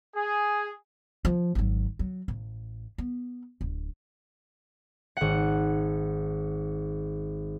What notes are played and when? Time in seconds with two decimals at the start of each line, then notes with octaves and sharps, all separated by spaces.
0.13 G#4
1.25 F3
1.55 G#1 F#3
1.99 F#3
2.28 A1
2.98 B3
3.61 D1
5.17 G#1 F#5